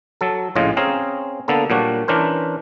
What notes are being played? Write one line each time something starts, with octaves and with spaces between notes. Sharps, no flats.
F#3 A4
A#1 A2 C#3 F4 G#4 D#5
C4 C#4 G#4 F5 A#5
D3 A#3 B3 A4
A#2 F#3 G3 D4 F#4
E3 C#4 D4 A#4 C5